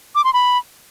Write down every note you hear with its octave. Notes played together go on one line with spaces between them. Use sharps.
D6
C6
B5